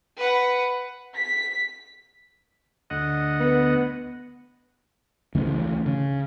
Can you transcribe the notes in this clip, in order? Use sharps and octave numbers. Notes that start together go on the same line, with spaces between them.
B4 F#5
B6
D2 D#5 F#5
B3
C#2 C#3 E3 A3
C#3